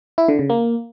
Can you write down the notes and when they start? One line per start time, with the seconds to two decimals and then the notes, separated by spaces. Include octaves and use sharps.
0.18 E4
0.28 D3
0.39 C#3
0.50 A#3